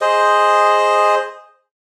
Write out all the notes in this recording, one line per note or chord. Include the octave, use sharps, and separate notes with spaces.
G#4 C5 D#5